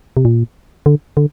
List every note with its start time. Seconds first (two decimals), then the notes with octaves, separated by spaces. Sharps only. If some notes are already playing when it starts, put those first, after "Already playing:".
0.17 C3
0.25 A#2
0.86 D3
1.17 D3